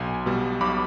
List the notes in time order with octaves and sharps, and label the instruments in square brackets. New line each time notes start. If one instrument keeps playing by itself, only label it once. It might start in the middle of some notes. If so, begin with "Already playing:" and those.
Already playing: [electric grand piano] B1 G#5 C6
B2 G3
B1 B5 D6